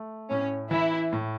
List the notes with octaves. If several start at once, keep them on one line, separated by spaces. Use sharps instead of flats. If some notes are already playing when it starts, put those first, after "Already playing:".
Already playing: A3
A2 C#4
E3 E4
A2